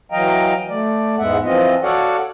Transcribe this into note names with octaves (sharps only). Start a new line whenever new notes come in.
E3 F#3 D#5 F5 G5 A#5
A3 D5
E2 G#2 G#3 B3 E5 F#5
E3 F3 C4 F4 D#5
F#4 A4 C#5 D5 F5 F#5